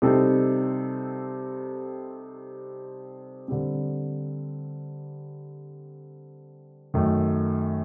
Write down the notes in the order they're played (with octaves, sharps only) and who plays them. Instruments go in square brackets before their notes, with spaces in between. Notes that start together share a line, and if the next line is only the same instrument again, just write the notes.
[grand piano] C3 G3 C4 D#4 A4
D3 G3 C4
F#2 D#3 A3